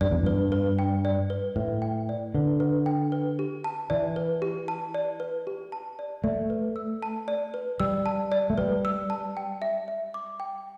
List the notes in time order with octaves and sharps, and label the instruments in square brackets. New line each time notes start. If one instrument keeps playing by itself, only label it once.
[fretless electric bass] G2 [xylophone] D5
[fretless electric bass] E2
[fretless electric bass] G2 [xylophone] B4
[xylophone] B4
G5
D5
B4
[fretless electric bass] A2 [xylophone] B4
[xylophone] G5
D5
[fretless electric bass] D3 [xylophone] B4
[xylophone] B4
G5
B4
G4
A5
[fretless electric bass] E3 [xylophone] D5
[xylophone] B4
G4
A5
D5
B4
G4
A5
D5
[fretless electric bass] A3 [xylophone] D5
[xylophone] B4
E6
A5
D5
B4
[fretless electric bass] G3 [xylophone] E6
[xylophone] A5
D5
[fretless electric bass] A3
[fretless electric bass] G3 [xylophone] B4
[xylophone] E6
A5
G5
E5
E5
D6
G5